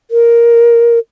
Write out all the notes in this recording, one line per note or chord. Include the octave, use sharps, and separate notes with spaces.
A#4